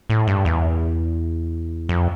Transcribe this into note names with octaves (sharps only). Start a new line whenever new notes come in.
A2
G2
E2
F2